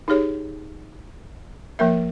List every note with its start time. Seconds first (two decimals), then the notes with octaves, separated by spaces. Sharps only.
0.08 D#4 G4 G#4 C#5
1.79 F3 A#3 A#4 E5